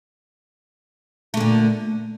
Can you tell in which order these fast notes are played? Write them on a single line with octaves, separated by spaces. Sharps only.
A3 D3 A#2